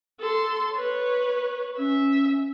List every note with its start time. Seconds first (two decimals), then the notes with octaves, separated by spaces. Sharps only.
0.20 A4 C6
0.75 B4 C#5
1.79 C#4 E5